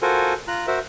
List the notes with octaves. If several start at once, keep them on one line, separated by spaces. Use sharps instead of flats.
F4 F#4 A4 A#4 C5 G#5
F4 A#5 F#6
F#4 A#4 C5 E5